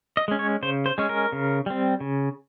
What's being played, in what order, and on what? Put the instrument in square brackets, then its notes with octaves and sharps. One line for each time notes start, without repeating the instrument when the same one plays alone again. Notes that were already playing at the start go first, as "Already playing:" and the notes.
[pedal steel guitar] D#5
G#3 C#4
C#5
C#3 C5
C5
G#3 C#4
A#4
C#3
G3 C4
C#3